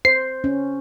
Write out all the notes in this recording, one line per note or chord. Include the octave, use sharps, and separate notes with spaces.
C5 C7
C#4